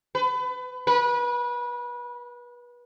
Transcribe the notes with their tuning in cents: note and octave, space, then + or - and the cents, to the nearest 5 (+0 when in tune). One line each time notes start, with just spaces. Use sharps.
B4 +30
B4 -30